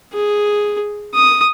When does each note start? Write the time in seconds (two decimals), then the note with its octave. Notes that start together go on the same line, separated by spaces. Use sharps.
0.13 G#4
1.14 D#6